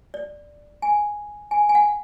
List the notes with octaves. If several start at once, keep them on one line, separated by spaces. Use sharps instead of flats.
D5
G#5
G#5
G#5
F#5